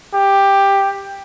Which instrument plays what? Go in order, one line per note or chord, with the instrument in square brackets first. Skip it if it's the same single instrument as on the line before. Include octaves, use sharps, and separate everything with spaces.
[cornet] G4